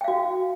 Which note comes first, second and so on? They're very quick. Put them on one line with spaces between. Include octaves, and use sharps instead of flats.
G5 F5 F#4